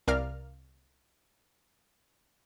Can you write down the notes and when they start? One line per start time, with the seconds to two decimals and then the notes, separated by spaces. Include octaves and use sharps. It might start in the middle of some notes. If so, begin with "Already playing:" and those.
0.07 C2 A#4 D5 F5 F6